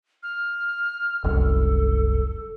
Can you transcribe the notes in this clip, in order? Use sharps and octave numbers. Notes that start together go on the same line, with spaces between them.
F6
F#1 C2 F#2 A4